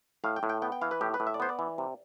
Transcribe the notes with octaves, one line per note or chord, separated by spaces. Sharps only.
A2 F5
G5
A2
G5
B3 G5
G5
E3 F5
B4
A2 G4
B4
A2
E5
D5
B3 C5
D5
E3
C3